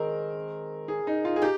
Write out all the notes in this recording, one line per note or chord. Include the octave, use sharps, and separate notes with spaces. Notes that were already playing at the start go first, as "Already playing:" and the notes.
Already playing: D#3 G#3 C4 A#4
G#4
D#4
F4
G#4
D#4 G4